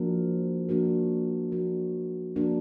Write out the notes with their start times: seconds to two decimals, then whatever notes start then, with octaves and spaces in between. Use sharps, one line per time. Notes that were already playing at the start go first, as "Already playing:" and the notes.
Already playing: F3 A#3 D4 F#4 A#4
0.69 F3 A#3 D4 F#4 A#4
1.52 F3 A#3 D4 F#4 A#4
2.36 F3 A#3 D4 F#4 A#4